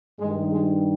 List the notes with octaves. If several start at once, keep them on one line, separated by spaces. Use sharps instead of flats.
G2 D#3 G#3
G#3